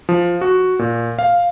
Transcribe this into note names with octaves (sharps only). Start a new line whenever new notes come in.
F3
F#4
A#2
F5